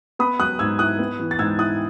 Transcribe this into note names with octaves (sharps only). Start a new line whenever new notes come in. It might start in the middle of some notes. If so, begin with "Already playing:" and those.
B3 B5 D#6
F#3 D#6 F#6
G#2 E6 G#6
E4 D#6 F#6
B3
E3
A6
G#2 E6 G#6
E4 D#6 F#6